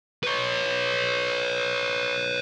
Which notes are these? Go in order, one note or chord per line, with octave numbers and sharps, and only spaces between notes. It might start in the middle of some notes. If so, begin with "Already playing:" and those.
B4 C#5